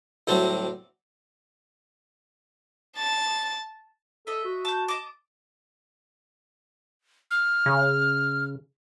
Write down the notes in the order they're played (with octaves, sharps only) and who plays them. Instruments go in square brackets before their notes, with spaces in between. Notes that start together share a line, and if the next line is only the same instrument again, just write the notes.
[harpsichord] D2 A2 F#3 G3 C4 D4
[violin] A5 A6
[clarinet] A4 [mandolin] D#5 E5
[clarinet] F#4
[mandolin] A5 G6
D#5 A5 D6
[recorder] F6
[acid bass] C#3